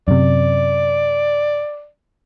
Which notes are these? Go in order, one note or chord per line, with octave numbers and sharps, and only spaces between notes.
F#2 C3 D5